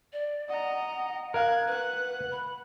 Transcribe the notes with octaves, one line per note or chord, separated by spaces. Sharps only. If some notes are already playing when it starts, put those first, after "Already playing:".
D5
D#5 F#5 A#5
A#4 F5 F#6 G#6
B4 F#5 F#6
B5